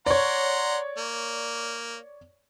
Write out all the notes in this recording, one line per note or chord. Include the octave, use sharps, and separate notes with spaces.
C#5 D5 F#5 A#5 C6
A#3